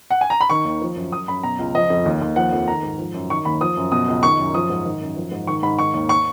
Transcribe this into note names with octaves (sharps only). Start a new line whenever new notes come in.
F#5
G#5
A#5
B5
D#3 C#6
D#2
F3
F#2
F#2 D#6
F#2 B5
B2 A#5
C#2
F3 D#5
F2
D#2
D#2
F3 F#5
F2
D#3 A#5
G#2
F3
F#2
D#3 C#6
D#2 B5
F3 D#6
F#2
B2 D#6
C#2
D#3 C#6
F#2
F3 D#6
G#2
D#3
F#2
F3
G#2
D#3 C#6
G#2 B5
D#3 C#6
D#2
C#6